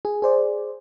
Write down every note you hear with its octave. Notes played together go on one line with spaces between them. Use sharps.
G#4
G#4 C5 D5